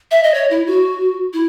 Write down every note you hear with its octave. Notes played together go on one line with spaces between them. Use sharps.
E5
D#5
C#5
E4
F#4
E4